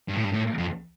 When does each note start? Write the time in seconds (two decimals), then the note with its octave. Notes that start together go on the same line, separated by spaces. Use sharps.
0.08 G2
0.16 A2
0.24 G2
0.33 A2
0.58 F2